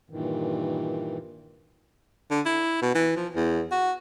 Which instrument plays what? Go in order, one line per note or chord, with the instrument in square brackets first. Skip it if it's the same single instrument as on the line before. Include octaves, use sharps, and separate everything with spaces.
[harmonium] G2 A#2 D#3 E3
[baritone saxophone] D3
E4
B2
E3
F3
E2
F#4